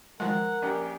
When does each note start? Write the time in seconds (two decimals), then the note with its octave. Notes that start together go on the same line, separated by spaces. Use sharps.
0.20 D#3 F3 G#3 A#4 F#5
0.62 A#1 C#4 G4